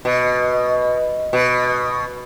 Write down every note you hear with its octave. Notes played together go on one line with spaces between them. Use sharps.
B2 D#5
B2